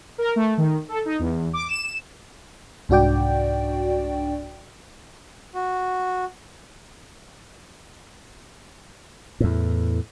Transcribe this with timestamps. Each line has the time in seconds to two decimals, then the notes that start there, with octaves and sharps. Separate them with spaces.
0.18 A#4
0.36 A3
0.58 D#3
0.89 A4
1.05 D#4
1.19 E2
1.53 D6
1.69 E7
2.89 C2 G#2 D4 F#4 D5 G5
5.55 F#4
9.40 E2 A2